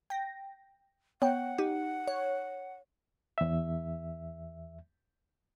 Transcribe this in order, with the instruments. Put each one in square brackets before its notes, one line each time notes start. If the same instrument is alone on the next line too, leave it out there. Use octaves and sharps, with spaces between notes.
[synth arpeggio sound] G5 A#6
[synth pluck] B3 [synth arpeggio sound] C#5 G5 [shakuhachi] F#5
[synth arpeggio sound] D#4 [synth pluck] G4
[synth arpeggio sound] C#5
[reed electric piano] E2 E5